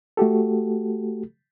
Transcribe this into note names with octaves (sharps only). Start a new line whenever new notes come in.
A3 F#4 G4 A4